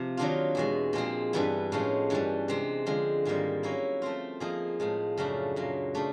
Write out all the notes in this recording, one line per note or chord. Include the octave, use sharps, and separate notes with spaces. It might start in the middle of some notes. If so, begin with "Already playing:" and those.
Already playing: C3 F3
D#3 F#3 A#3 D4 F4
E2 B2 G#3
A#2 F3 G#3 C4
G2 E3 G3 B3 E4
A2 F3 G#3 C#4
G2 E3 G3
C3 E3 G#3 C4
D3 F3 G#3
G#2 D#3 G3 A#3
F#3 A#3 C#4 E4
F3 A3 C4 F4
F3 A#3 D#4 G#4
A2 F3 G#3
F#2 C#3 F3 A3 D4
A#2 F#3 A#3
C#3 A3 D4